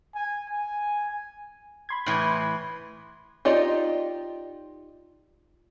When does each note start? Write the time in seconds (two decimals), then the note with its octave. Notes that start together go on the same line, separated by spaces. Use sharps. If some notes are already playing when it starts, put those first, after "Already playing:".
0.15 G#5
0.50 G#5
1.89 B5 C6 G#6
2.06 A2 E3
3.45 D#4 F4 G4 D5 D#5